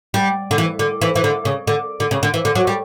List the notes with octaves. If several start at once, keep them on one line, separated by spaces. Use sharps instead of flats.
G3
D3
E3
D3
E3
E3
D3
C#3
D3
D3
C#3
D3
E3
D3
F#3
G3